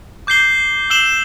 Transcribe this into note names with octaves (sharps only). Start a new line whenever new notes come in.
D6 G6 C7 G7
E6 C7 E7 G7